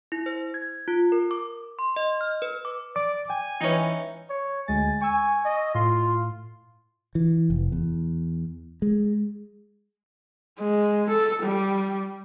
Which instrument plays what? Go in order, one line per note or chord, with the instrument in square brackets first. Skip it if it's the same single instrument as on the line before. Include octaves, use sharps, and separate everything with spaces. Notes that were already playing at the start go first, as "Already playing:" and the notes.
[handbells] E4
C5
G#6
F4
A#4
D6
C6
D#5
F6
B4
D6
[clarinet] D5 [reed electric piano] D6
[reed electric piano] G5 [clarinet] G#5
[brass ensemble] E3 [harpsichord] C#4 D#4
[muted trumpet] C#5
[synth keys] D2 G#3 A6 [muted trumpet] G#5
[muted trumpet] G#5 [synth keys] C#6 E6
[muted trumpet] D#5
[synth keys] A2 C6 [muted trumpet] F4
[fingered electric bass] E3
F1
E2
G#3
[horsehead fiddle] G#3
A4
G3